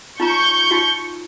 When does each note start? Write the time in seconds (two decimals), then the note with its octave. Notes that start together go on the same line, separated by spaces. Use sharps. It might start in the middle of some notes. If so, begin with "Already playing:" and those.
0.20 D#4 F4 A#5 C#6 G6
0.71 D#4 F4 F#4